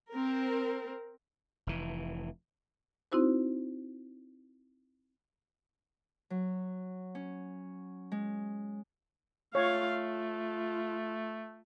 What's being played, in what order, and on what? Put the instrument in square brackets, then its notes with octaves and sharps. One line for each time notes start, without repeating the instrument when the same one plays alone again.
[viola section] C4 A#4
[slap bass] F1 E3
[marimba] C4 D#4 E4 F#4 C5
[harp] F#3
C#4
G#3
[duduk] A3 [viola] F4 F5 [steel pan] C#5
[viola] F4